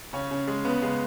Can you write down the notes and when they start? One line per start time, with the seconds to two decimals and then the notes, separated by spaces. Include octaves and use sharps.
0.13 C#3 C#4
0.31 C#3
0.48 G#3
0.64 C#3 B3
0.82 C#3 G#3